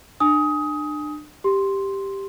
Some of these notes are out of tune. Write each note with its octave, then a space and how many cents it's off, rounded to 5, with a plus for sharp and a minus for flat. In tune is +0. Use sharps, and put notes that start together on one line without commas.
D4 +35 G#5 +0 D#6 +20
G4 +0 C6 +0